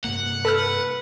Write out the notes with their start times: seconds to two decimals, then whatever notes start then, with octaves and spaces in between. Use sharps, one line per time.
0.04 G2 C3 A#3 F#5
0.45 A4 B4 E6 F6